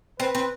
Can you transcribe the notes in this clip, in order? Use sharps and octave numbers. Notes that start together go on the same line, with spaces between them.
C4 B4
C4